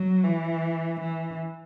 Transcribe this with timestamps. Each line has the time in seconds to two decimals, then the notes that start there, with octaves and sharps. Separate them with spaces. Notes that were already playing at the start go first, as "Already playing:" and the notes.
Already playing: F#3
0.23 E3
1.00 E3